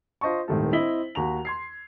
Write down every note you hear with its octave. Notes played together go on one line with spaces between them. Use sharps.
F4 C5 D#5 A5 C#6
D#1 G#1 A2 D#3 G3 A4
C4 E4 D#5 B6 F#7 G7
D#2 F#4 A#5 F7
C6 G#6 C7